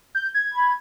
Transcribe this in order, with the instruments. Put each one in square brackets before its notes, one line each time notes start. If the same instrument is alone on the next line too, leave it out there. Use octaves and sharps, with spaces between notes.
[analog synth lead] G6
G#6
[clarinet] B5